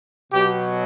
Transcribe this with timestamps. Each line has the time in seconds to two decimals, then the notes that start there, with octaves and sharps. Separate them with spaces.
0.32 B2 F#3 G4